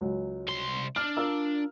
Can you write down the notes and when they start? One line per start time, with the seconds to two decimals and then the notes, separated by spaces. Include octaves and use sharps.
0.01 C#2 F#3
0.48 C2 C6
0.96 D4 F6
1.17 F4 A#4 E6